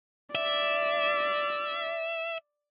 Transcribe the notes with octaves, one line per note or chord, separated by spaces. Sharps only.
D5 E5